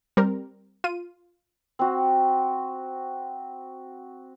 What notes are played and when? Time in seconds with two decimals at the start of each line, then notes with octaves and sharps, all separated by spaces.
0.17 G3 C4 A#4
0.84 F4 D#7
1.79 C4 F#4